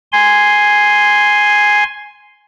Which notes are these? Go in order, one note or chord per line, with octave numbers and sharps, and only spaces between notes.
G#5 C6